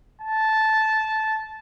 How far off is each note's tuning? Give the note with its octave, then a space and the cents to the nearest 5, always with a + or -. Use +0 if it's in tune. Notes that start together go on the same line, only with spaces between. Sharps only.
A5 -10